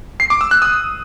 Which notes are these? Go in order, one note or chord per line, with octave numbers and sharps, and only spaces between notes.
C7
D6
E6
F#6
D#6